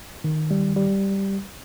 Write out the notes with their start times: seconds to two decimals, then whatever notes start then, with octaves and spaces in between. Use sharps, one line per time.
0.24 D#3
0.51 G3
0.76 G3